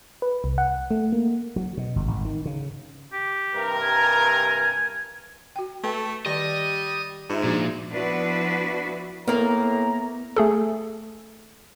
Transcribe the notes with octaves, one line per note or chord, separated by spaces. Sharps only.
B4
C2
F#5
A3
A#3
F#3
B2
G1
G#1
D#3
C#3
G4
G2 C3 A#4
G#5
F#4 G5
A3 B4 G5
D#3 G3 D5 D#5
G#2 F4 E5
A#2 F3 D4 F#4
F3 B3 D4 E4 F#4 B4
A2 A#3 B3 A#4 A#5
A3 G#4 A4